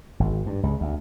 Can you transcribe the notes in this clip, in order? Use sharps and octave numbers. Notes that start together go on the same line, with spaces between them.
G#1
G2
C#2
D2